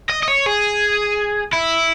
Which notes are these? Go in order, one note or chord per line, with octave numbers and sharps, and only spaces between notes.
D#5
D#5
C#5
G#4
E4